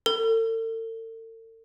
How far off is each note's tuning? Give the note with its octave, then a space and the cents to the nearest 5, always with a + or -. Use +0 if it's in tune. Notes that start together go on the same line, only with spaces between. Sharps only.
A4 +45